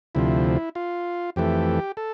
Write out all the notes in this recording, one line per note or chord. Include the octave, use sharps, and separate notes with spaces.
D2 C3 F3 E4
F4
F2 E3 A3 G4
A4